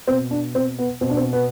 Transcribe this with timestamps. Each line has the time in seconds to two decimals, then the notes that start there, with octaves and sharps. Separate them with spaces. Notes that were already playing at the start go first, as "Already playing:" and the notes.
0.07 B2 C4
0.31 D4
0.55 C4
0.79 B3
1.01 B2 C4
1.10 D4
1.17 C4
1.33 B3